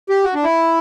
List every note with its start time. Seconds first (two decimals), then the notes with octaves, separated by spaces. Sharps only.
0.09 G4
0.24 F#4
0.34 D4
0.44 E4